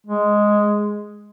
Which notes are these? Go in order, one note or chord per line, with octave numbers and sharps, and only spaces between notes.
G#3